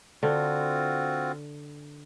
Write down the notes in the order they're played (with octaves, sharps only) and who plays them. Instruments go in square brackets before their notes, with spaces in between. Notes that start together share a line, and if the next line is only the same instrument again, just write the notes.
[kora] D3 [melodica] C4 F4 F#4